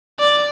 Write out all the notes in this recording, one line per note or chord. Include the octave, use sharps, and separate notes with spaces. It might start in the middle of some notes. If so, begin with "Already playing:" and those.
D5